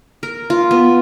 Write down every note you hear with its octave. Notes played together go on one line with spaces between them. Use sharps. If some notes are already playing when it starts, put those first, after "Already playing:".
A#4
F4
B3